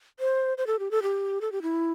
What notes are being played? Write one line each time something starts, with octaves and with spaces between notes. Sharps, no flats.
C5
C5
A4
G4
A4
G4
A4
G4
E4